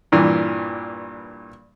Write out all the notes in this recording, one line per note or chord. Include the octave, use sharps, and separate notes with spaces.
G2 A#2 E3